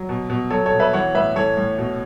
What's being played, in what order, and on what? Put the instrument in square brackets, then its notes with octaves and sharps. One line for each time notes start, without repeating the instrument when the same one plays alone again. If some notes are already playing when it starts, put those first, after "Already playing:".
Already playing: [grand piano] F#3
B2
B2
F#3 A4 C#5
A4 C#5
B2
B4 E5
E3 C#5 F#5
A2 B4 E5
E3 A4 C#5
A2
B2